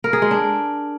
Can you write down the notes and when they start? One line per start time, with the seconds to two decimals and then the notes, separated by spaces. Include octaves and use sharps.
0.04 A#4
0.13 G#4
0.22 G#3
0.31 D4